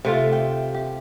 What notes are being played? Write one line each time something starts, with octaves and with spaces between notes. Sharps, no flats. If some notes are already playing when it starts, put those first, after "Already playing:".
C3 A3 F4
G5
G4